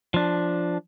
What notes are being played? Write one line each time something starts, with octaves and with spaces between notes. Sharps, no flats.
F3 D4